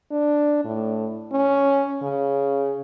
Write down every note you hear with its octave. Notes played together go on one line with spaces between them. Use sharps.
D4
A2
C#4
C#3